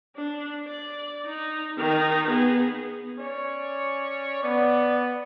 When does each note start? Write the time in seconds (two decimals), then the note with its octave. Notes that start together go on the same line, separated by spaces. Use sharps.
0.16 D4
0.68 D5
1.26 D#4
1.78 D#3 D#4
2.28 B3 G#4
3.18 C#4 C#5 D5
4.43 B3 D5